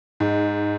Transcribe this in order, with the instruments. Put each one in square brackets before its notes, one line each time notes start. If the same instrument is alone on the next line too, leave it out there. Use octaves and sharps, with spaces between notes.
[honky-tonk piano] G#2